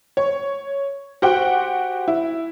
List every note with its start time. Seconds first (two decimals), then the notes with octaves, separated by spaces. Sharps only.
0.17 C#5
1.22 F#4 G4 C5 F#5 G5
2.08 E4